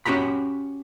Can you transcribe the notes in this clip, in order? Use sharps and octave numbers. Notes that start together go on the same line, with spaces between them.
C#4 F#4 G4 A#5 B5